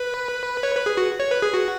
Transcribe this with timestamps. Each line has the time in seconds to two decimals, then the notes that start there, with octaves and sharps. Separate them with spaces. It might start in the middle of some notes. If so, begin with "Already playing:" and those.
Already playing: B4
0.63 C#5
0.75 B4
0.86 G#4
0.97 F#4
1.20 C#5
1.31 B4
1.42 G#4
1.54 F#4